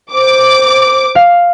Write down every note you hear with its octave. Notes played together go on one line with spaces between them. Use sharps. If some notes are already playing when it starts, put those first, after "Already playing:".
C5 D6
F5